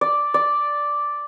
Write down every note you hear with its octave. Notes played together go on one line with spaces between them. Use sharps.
D5
D5